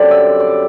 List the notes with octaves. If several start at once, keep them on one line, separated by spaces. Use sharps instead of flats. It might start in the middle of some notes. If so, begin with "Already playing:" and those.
Already playing: F#2 D3 G3 C4 D5
E5
D5